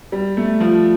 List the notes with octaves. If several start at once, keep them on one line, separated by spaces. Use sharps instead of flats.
G3
A3
F3